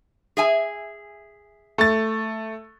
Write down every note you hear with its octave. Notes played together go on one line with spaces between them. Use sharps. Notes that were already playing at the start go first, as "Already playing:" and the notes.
G#4 E5 G#5
A3 A6